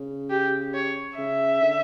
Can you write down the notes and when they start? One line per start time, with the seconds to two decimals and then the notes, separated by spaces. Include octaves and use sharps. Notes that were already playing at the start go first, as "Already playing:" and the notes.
Already playing: C#3
0.30 G4
0.74 C#5
1.17 C#3 E5
1.62 D3